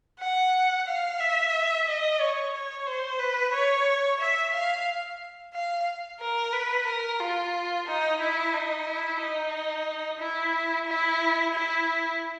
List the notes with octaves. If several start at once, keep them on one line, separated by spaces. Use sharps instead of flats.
F#5
F5
E5
D#5
C#5
C#5
C5
B4
C#5
E5
F5
F5
A#4
B4
A#4
F4
D#4
E4
D#4
E4
D#4
E4
E4
E4